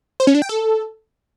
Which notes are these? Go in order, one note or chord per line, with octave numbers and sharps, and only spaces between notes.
C5
C#4
D4
G5
A4